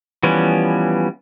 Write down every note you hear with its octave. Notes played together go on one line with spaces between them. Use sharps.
E3 F3 G3 B3 C#4